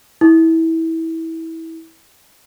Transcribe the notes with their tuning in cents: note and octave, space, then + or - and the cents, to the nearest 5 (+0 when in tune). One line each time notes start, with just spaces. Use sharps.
E4 -20